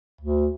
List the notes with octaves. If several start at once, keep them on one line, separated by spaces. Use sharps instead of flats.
D2